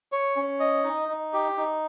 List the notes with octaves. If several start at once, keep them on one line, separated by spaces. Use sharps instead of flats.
C#5
C#4
D#5
D#4
D#4
G4
D#4